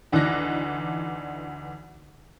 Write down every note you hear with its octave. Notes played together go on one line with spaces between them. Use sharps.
D2 E3 D4 D#4 F#6 A#6